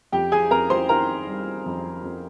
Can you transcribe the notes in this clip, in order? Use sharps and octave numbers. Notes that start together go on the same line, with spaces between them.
F2 G4 G5
G#4 G#5
F2 A#4 A#5
C5 C6
D#3 A#4 A#5
G3
F2
F2